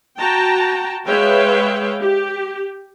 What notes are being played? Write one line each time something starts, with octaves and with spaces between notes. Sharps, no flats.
F#4 G5 A5 A#5
G#3 B4 C#5 E5 F5 G5
G4